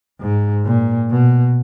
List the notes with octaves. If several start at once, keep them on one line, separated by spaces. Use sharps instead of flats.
G#2
A#2
B2